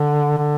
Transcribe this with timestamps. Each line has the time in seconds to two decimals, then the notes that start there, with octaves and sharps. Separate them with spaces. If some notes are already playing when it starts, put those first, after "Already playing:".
Already playing: D3
0.38 D3